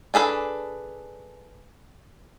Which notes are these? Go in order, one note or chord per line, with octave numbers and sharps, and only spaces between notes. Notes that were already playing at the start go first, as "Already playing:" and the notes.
D4 G#4 A4 B4